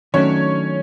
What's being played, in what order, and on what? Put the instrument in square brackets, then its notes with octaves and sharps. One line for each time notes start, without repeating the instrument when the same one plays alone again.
[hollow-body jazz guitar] D#3 F#3 A3 D4 [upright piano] C#4 C#5